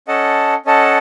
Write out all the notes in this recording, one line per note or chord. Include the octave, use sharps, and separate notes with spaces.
C#4 A4 D#5 F#5 A5
C#4 A4 D#5 F#5 A5